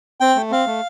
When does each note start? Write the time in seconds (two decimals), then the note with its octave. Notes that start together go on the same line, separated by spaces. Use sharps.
0.20 C4 G5
0.36 A3
0.51 C4 F5
0.67 A3